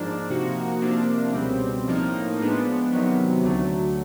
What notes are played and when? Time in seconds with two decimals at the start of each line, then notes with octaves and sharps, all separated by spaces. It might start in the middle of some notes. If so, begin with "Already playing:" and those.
Already playing: G#2 F3 A#3 D4
0.30 C3 F3 A#3 D#4 F#4
0.82 C3 F3 A#3 D4
1.34 C#2 B2 G3 C4
1.87 A2 F3 A#3 D#4
2.39 F3 G#3 B3 D4
2.92 C3 D#3 F#3 B3
3.43 D2 D3 F#3 A3